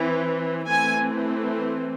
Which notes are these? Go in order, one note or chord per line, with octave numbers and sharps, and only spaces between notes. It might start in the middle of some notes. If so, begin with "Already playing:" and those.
Already playing: E3 C4
E3 A3 C4 G#5